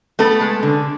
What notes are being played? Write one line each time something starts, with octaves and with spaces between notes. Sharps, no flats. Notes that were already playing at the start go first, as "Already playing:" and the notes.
A3 B3 A4
G#3
D3